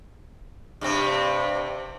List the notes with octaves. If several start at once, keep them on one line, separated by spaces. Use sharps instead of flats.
G2 C3 C4